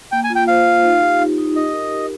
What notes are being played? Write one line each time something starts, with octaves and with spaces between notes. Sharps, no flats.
A#3 G5
G#5
F4
G5
C5 F5
F4
D#4
G4
D#4
D#4
G4 D#5
A#4
G4